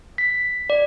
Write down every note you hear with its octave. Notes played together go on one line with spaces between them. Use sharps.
B6
D5